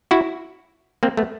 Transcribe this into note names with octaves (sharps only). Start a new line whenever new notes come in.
E4 F#4
A#3 C4
A3 B3